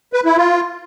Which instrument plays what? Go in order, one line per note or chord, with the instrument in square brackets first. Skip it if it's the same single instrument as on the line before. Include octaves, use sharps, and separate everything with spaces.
[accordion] B4
E4
F4